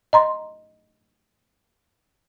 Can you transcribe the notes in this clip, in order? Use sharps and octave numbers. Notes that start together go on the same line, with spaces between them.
D#5 A#5 C6